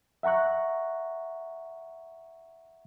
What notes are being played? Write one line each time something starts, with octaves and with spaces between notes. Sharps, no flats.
E5 F#5 A#5 C#6 F#6